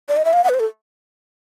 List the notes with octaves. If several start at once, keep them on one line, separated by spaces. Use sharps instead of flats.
D5
D#5
E5
F5
F#5
B4
C5
A4